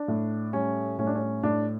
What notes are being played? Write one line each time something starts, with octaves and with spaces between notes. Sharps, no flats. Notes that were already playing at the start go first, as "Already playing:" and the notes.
Already playing: D4
A2
G3 C#4
A2 C#4
D4
C#4
A2 D4